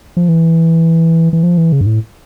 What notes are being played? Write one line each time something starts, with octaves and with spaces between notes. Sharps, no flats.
F3
E3
E3
F3
E3
C#3
G2
A2